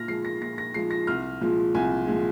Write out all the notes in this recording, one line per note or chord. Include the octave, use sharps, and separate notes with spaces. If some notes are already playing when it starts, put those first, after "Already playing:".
Already playing: A#2 F6 A#6
F3 G#3 C7
A#6
A#2 A#6
A#6
F3 G#3 C7
A#6
C2 F6
A#2 F3 G#3
C2 G#5
A#2 F3 G#3